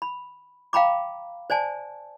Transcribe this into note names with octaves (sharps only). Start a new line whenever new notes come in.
B5
F5 G5 A#5 B5 D6
C5 D5 G#5 A5